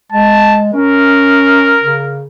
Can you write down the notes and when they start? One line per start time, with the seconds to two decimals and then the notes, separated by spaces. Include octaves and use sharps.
0.12 G#3 A5
0.73 C#4 A#4
1.82 C#3